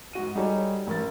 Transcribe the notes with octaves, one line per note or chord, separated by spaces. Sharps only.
G#2 F#4 D#7
G3 D#4 F#4 G#4 A4 C#5
A1 A#4 A6